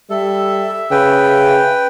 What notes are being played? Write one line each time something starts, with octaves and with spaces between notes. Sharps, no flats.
G3 A4 E5
C#3 G#4 B4 G5